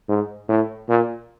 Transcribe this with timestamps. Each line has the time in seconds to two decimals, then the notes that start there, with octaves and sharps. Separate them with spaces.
0.09 G#2
0.48 A2
0.89 A#2